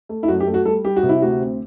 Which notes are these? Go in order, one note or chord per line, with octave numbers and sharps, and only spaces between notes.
A3
E4
F#2 F#4
G4
A3
F#4
G3 A4
G3 G4
F#4
C3
E4
D2 F#4
C4